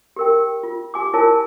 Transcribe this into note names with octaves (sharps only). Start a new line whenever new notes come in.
G4 A#4 G5
F4
G4 G#5 D6
E4 F4 A#4 C#5 G#5 A5